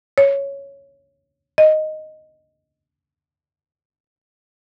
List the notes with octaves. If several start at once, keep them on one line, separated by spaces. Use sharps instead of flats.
C#5
D#5